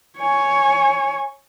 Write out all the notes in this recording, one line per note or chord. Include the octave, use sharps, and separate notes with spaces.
C#5 G#5